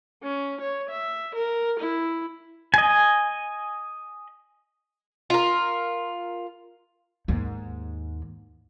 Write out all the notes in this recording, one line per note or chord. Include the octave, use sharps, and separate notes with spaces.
C#4
C#5
E5
A#4
E4
D#5 G#5
F4 A#4
D#2 G#2